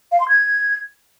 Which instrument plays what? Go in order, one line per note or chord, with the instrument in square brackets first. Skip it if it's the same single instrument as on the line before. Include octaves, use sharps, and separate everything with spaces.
[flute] F5
C6
G#6